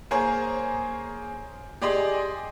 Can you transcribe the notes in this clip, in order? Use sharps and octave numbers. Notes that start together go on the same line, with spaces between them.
A#3 G#4 C5 C#5 G#5 A#5
G4 G#4 D5 D#5 G#5 C6